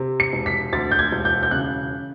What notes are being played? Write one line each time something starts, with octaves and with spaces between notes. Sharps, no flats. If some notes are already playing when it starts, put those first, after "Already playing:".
Already playing: C3
C#7
E1
B6
D2 A6
G6
G#6
E1
G6
G6
C#3 F#6